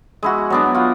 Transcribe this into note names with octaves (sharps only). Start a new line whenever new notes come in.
G#3 E4 F#4
F#3 B3 D4
F4 F#5